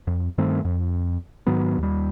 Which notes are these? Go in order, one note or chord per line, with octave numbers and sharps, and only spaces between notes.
F2
G2 D#3 A3 C4
F2
G#2 D#3 F#3 B3
D#2 G3